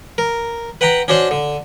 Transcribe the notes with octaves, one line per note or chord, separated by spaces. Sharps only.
A#4
B4 F#5 G5 A#5 B5
C#4 D4 F#4 C5 F#5 C6
D3